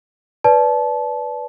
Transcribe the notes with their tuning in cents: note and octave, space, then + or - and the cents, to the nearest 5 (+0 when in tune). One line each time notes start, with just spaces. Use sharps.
B4 +0 D5 -20 A5 -25